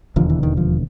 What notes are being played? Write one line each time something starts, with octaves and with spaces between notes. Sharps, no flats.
E1 D#2 D3 F3
E3
D#3
F3